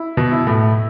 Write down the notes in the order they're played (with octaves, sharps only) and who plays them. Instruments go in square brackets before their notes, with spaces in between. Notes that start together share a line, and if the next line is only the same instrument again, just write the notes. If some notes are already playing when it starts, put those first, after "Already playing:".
Already playing: [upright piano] E4
[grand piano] B2
[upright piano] E4
[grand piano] A2